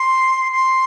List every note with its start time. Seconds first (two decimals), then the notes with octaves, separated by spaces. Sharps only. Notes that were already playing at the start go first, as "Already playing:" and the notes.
Already playing: C6
0.52 C6